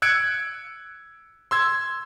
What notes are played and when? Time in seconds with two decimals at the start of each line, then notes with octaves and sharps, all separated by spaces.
0.02 E6 F#6 G#6 C#7 D7
1.51 C6 E6 G#6